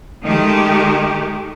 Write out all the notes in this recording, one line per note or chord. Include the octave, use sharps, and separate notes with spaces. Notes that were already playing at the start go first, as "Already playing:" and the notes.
D#3 G#3 A3 G4